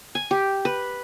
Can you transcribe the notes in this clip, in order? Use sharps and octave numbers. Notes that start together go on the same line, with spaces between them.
G#5
G4
B4